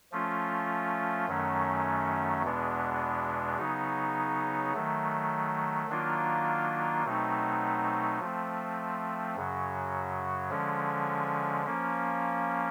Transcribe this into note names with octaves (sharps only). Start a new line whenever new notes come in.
F3 A3 C#4 F4
F#2 D#3 F#3 A3 C#4
E2 B2 G#3 B3 D4
C#3 F#3 B3 D#4
D#3 F#3 A3
D#3 F#3 A#3 D4 F4
B2 F#3 A3 C4 D#4
F3 A3 C4
F#2 C#3 F#3
D3 F3 G#3 C#4
F3 A#3 C#4